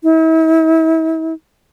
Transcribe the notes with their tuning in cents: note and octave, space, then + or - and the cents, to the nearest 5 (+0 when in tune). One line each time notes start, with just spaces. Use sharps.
E4 -40